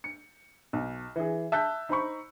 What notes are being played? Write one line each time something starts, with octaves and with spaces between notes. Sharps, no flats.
C#7
B1
E3 G#4
E5 A5 E6 F#6 G6 B6
D#4 C5 B5 C#6